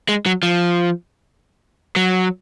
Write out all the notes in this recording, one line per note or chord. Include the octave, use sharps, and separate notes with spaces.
G#3
F#3
F3
F#3